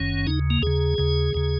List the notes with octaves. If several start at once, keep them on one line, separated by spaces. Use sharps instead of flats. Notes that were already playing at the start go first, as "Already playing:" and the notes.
Already playing: F#1 F#2 D#3 C#4
D#2 C#3 D#4
A#3
D#2 C#3 G#4
D#2 C#3
D#2 C#3